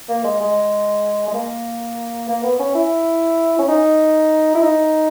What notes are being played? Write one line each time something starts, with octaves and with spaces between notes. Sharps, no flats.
A#3
G#3
G#3
G#3
A#3
A#3
B3
C#4
E4
C#4
D#4
E4
D#4